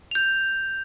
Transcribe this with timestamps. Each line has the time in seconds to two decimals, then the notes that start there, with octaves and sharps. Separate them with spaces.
0.11 G6 F7